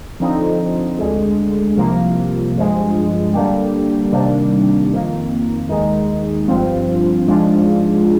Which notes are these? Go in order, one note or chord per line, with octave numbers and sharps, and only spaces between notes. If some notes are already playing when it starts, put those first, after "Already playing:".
D3 F3 C4 D#4
D2 D3 G#3
C2 C3 F3 A#3
G2 F3 G#3
D3 G3 A#3 D4 G4
C3 D#3 G3 A#3 D4
F2 D#3 A#3
D#2 D#3 G#3 D#4
G1 G2 F3 C4 F4
G#2 F3 G#3 D4 F4